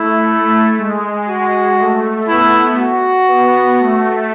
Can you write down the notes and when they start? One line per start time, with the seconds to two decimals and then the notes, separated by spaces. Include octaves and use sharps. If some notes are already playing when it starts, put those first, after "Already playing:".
Already playing: A3 E4
0.28 A3
0.78 G#3
1.29 F#4
1.79 A3
2.28 B3 E4
2.78 F#4
3.28 B3
3.78 A3